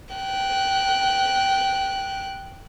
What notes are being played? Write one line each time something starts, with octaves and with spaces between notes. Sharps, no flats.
G5 F#6